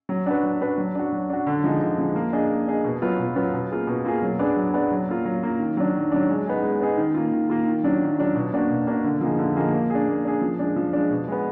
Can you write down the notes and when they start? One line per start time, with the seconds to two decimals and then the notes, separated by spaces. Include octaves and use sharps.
0.09 F#3
0.26 D4 F#4 B4
0.43 F#3
0.61 D4 F#4 B4
0.78 F#3
0.95 D4 F#4
1.12 F#3
1.29 D4 F#4
1.47 D3
1.64 F3 G#3 D#4
1.81 D3
1.98 F3 G#3 D#4
2.15 A#3
2.33 D4 G#4 D#5
2.50 A#3
2.67 D4 G#4 D#5
2.84 B2
3.02 F#3 B3 F4
3.19 B2
3.36 F#3 B3 F4
3.53 B2
3.70 A#3 F4 G#4
3.87 B2
4.05 A#3 F4 G#4
4.22 F#3
4.39 B3 D4 G#4 D5
4.57 F#3
4.74 B3 D4 G#4 D5
4.91 F#3
5.08 A#3 F4
5.25 F#3
5.43 A#3 F4
5.60 D#3
5.77 F#3 D4
5.94 D#3
6.12 F#3 D4
6.29 G#3
6.46 B3 D#4 G#4
6.63 G#3
6.80 B3 D#4 G#4
6.98 D#3
7.15 A#3 F4
7.32 D#3
7.50 A#3 F4
7.66 D#3
7.84 F#3 D4 F4
8.01 D#3
8.19 F#3 D4 F4
8.35 B2
8.53 A#3 D4 F#4
8.70 B2
8.87 A#3 D4 F#4
9.04 D3
9.21 F3 A#3 D#4 G#4
9.39 D3
9.56 F3 A#3 D#4 G#4
9.73 A#3
9.90 D4 G#4
10.08 A#3
10.24 D4 G#4
10.42 F3
10.59 G#3 D4
10.76 F3
10.93 G#3 D4
11.11 B2
11.28 G#3 B3